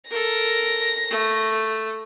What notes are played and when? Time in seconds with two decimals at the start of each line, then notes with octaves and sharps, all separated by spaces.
0.10 A4 A#4 A#6
1.10 A3